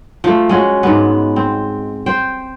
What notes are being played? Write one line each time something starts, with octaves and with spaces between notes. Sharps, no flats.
F3 A3
G#3 C#4 F#4
G#2 B3
C4
C5 G5